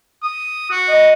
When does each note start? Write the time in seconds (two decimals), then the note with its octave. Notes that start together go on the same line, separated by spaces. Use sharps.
0.23 D#6
0.71 F#4
0.88 D#5